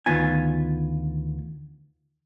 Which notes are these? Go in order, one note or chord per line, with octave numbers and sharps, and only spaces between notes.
D2 D#3 B3 F4 G#5